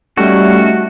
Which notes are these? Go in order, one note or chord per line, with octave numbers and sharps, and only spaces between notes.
G3 A3 C#4 D#4 F#4